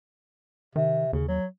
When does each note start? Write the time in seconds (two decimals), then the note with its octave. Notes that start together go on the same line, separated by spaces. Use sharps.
0.76 C3 D#3
1.13 D#2 C#3
1.29 F#3